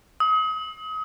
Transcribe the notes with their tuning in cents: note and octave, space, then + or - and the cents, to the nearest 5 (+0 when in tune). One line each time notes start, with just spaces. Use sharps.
D#6 +35